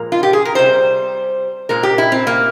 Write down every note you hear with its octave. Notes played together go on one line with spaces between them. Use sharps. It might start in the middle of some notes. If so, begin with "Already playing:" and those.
Already playing: A#2 F3 G#3 A#4
F4
G4
G#4
A#4
C3 G3 C5
A#2 G#3 A#4
G4
E4
C4
A#3